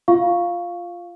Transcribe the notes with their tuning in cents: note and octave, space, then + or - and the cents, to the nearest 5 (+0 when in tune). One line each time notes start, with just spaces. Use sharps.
F4 +0 F5 +0 C#6 +0